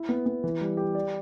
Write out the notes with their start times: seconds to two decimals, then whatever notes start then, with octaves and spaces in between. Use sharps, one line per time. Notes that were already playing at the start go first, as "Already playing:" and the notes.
Already playing: E4
0.09 B3
0.26 B3
0.44 E3
0.61 G3
0.77 G4
0.95 D5